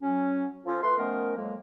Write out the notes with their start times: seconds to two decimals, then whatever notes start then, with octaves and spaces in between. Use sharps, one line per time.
0.02 F#3 C#4
0.65 F3 C#4 F4 A4
0.83 A3 B4 C6
0.97 D#3 F3 A3 B3 C#4 A#4
1.36 F2 F#3 G#3 A#3